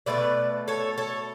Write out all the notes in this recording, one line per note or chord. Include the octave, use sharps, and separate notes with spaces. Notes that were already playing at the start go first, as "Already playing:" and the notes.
B2 F#3 A3 B4 D5
A4 C#5
A4 C#5